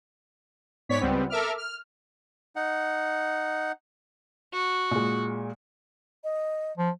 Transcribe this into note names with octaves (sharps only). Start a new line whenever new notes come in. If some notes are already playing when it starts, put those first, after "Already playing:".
G#2 B3 C#5 D5 B6
C#2 G3 B3 C4
A4 A#4 E5 D6 F6
F6
D#4 F#5
F#4
A#2 G#3
D#5
F3